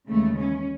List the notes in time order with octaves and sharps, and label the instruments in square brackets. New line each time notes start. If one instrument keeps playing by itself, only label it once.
[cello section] D#2 C#3 E3 G#3 A3
C#4